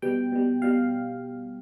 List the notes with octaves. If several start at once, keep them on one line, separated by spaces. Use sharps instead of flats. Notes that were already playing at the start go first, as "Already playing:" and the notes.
B2 G3 G5
B2 G3
B2 G3 F5